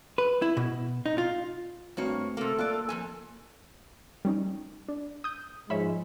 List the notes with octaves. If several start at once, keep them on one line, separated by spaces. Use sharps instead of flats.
B4
E4
B2
D#4
F4
G2 A3 A#3 C4 F#4 C#5
C3 A#3 A4
A#3 F4 D5 F#6
F2 G#2 G#5
G3 C#4 D#4
D4
D#6 G6
G#2 F3 G#3 C#5 E5 B5